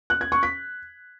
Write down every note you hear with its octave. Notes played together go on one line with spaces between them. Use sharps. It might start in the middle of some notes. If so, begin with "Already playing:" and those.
F#6
G#6
C#6
B6